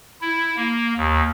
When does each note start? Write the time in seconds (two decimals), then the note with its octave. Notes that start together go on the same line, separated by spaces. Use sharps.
0.21 E4
0.57 A#3
0.97 D#2